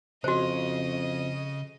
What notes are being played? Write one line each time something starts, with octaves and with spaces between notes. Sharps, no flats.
F2 C#3 F#4 C5 D#5